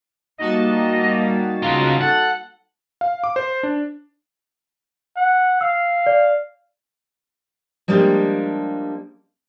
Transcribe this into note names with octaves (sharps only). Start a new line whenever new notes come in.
G3 A#3 D#4 F#4 D#5 A5
C#3 F4 A#5
A4 F#5
F5
D6
C5
D4
F#5
F5 E6
D5
F3 G3 G#3 A#3 D4 G4